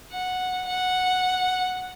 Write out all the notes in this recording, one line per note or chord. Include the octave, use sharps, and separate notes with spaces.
F#5
F#5